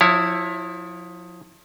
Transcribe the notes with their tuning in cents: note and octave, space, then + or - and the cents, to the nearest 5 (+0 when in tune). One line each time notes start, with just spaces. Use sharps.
F3 +30 E4 +0 C#5 +0